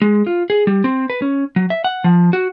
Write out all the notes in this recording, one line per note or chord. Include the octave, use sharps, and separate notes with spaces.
G#3
F4
G#4
G3
C4
B4
C#4
F#3
E5
F#5
F3
F#4